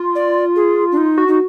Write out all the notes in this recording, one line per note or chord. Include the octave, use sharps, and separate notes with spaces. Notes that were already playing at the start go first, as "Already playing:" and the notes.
Already playing: F4
D5
G#4
D4
D#4
F#4
D#4